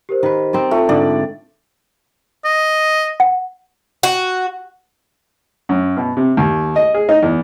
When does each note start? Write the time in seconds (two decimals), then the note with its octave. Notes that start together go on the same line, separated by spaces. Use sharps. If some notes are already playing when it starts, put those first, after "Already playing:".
0.09 G4 A#4 C5
0.23 D#3 B4
0.53 C4 D#4 D5
0.71 A3 F4
0.89 G#2 D3 D5
2.45 D#5
3.20 F#5
4.03 F#4
5.69 F#2
5.97 B2
6.17 C3
6.37 D#2
6.76 D#5
6.94 G#4
7.09 D#4
7.23 E2